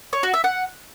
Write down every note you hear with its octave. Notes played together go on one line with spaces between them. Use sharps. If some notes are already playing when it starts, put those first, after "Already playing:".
C#5
F#4
E5
F#5